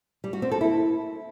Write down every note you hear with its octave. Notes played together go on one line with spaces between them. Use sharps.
G3
F#4
C4
A4
E4